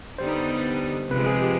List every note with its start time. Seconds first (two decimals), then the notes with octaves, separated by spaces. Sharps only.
0.19 D3 G3 B3 D#4 C5
1.11 C3 F3 G#3 B4
1.26 G#4
1.42 G4